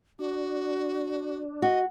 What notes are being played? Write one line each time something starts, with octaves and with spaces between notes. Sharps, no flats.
D4 F#4
F#4 D#5